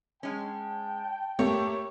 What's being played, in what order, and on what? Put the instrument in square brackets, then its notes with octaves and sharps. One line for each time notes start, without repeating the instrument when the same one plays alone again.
[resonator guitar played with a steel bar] G#3 C#4 [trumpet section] G5 A5
[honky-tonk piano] A3 A#3 G4 [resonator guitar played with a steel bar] C#5